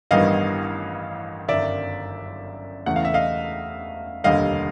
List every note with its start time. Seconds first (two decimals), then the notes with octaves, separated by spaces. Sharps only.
0.11 A1 G2 D#3 G3 B3 D#5 F5
1.49 G1 F#2 D#3 D5 E5
2.86 E1 E2 C#3 E3 A3 F#5
2.96 F5
3.05 E5
3.14 D#5 F5
4.24 F1 D#2 D3 G3 D#5 F5